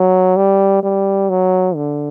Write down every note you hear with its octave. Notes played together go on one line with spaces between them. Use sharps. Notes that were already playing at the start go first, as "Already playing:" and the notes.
Already playing: F#3
G3
G3
F#3
D3